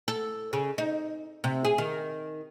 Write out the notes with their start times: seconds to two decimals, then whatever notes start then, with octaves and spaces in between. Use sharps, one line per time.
0.08 A4
0.53 C#3
0.78 D#4
1.44 C3
1.65 G#4
1.78 D#3